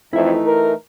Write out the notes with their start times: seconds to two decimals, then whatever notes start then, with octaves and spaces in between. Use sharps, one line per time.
0.13 F2 E3 A3 D#4 E4 E5
0.46 A#4